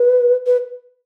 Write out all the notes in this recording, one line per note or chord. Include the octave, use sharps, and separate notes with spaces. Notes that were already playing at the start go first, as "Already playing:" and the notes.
Already playing: B4
B4